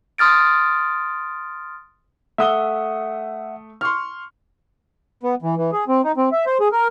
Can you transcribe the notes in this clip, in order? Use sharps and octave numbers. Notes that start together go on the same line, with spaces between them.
C6 D#6 F6 A6 D7
A3 E5 F#5 D#6 G7
C6 C#6 F6
B3
E3
E3
G#4
C4
D#4
C4
E5
C5
G#4
A#4